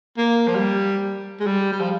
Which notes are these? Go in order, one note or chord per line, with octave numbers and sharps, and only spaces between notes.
A#3
F3
G3
G#3
G3
G3
F3